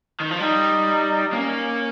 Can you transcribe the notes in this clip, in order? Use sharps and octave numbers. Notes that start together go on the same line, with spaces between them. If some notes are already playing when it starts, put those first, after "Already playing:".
D#3
F3
G3 D#4
A#3 C#4